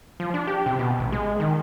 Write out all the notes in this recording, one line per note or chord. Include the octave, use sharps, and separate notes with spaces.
F3
D4
G4
C3
B2
A1
G#3
D#3